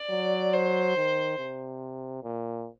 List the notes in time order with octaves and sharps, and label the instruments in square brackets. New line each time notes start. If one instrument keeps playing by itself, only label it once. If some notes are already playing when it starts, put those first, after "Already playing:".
Already playing: [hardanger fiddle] D5
[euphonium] F#3
[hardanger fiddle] C5
[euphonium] D#3
C3
A#2